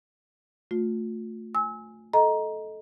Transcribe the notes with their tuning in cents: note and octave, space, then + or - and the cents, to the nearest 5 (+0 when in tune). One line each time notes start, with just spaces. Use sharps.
A3 +15 F4 +35
G#5 +0 E6 -30
A4 -15 D#5 +10 A#5 +15